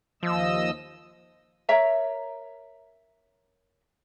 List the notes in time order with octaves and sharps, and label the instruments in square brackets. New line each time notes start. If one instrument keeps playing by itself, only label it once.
[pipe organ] D#2 D#5 E6 [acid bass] F3
[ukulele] A#4 C#5 E5 A#5